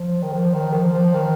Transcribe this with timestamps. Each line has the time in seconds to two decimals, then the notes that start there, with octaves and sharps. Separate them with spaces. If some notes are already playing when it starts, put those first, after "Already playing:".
Already playing: F3
0.23 D#3
0.33 F3
0.54 D#3
0.73 F3
0.93 F3
1.13 D#3